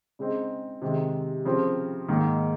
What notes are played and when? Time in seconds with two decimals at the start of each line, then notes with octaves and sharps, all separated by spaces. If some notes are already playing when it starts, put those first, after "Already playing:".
0.19 C#3 G#3 C4 D#4
0.82 C3 D#3 G#3
1.45 C#3 F3 C4
2.08 G#2 D#3 A#3 D#4